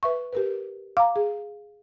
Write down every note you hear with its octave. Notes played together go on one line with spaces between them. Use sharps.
B4 E5 C#6
G4 A#4 B4
F5 A#5 D6
G#4